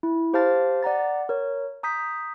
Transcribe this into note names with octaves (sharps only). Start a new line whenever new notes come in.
E4
G4 C5 F5 A5 F6 A6
D5 F#5 A#5 A6
A#4 C#5
A#5 D#6 G6 B6